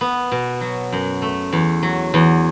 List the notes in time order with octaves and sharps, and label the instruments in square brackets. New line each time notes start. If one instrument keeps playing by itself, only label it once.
[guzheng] B3
B2
F#3
F#2
A3
E2
F#3
E2